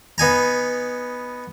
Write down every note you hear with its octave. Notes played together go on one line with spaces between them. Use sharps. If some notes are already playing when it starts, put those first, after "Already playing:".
B3 D#4 G#5 A#5